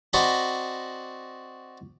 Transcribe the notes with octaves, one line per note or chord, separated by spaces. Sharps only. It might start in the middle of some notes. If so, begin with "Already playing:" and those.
C4 F#4 D5 D#5 A#5 B5